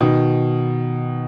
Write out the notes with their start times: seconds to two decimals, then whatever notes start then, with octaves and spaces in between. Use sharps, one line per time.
0.01 B2 D#3